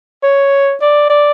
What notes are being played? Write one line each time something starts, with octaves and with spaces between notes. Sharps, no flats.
C#5
D5
D5